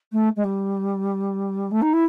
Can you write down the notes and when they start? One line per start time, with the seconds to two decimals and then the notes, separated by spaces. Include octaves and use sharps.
0.12 A3
0.36 G#3
0.44 G3
1.71 A3
1.81 D#4
1.93 E4